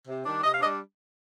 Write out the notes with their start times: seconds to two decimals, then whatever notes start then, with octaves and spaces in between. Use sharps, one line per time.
0.08 C3
0.26 D#3 G3 D4
0.43 C3 D#5
0.53 F5
0.61 G3 D4 D#5